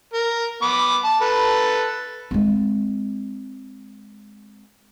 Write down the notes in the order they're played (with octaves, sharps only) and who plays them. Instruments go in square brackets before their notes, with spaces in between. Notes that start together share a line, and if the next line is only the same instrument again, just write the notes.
[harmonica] A#4
B3 D6
A5
A4 B4
[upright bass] G#3 C4